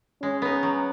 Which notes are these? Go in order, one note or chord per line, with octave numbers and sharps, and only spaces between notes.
G#3 C#4
B3 D#4
F#3